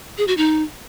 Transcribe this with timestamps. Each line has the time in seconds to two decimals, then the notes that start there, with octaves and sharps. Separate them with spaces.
0.18 G#4
0.28 F#4
0.37 D#4